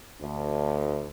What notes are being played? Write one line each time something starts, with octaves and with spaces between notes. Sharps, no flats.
D2